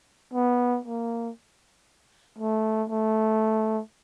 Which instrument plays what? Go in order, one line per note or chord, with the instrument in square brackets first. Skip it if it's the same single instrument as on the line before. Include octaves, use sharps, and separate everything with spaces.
[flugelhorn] B3
A#3
A3
A3